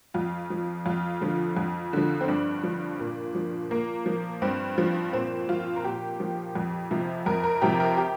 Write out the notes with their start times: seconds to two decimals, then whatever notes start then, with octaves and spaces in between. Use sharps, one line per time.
0.14 F2 F4
0.50 F3
0.86 F2 F4
1.21 D3 F3
1.57 F2
1.93 D3 F3
2.21 C4
2.28 G2 D4
2.64 F3
3.00 A#2
3.35 F3
3.70 A#2 A#3
4.06 F3
4.42 G2 C4
4.78 F3
5.13 A#2 C4
5.49 F3 F4
5.76 A#4
5.84 A#2 G4
6.20 F3
6.55 F2
6.91 C3 F3
7.26 F2 A#4
7.44 A#4
7.61 C3 F3 G4
7.80 A#4
7.97 G4